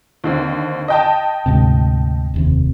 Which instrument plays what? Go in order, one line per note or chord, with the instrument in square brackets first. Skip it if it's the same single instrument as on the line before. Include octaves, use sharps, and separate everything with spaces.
[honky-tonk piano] D#2 D3 C4
D#5 G5 A5
[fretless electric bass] D2 G#2 C3
F1 D#2 C3